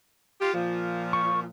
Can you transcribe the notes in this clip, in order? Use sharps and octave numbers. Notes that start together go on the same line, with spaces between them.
F4 G4
A#2 F3
C#6